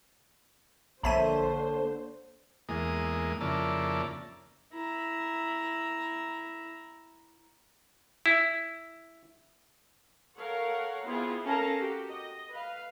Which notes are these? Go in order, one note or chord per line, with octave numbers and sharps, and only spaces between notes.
A#1 D3 A#3 C5 C#5 E5 A5 D#7
E2 G#3 A#3 D#6
F2 C#3 A#3 E4 D5 A5
E4 A#5
E4
A4 A#4 C#5 F5 F#5
B3 C4 E4 F4 G#4
C#4 A4 A#4 F5 A5 A#5
F#4 G4
D#5
B4 F5